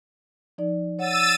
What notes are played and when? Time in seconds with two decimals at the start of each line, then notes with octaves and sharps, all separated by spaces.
0.58 F3 D#4 D5
0.99 C#5 F#5 E6 A6 D#7